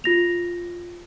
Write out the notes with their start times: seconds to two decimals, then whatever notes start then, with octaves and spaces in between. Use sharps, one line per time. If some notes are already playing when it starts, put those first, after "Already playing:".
0.04 F4 A#6 F7